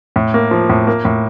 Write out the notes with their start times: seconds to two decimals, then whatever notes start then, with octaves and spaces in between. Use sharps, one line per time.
0.16 A2
0.34 A#3
0.51 F3
0.69 A2
0.87 A#3
1.05 A2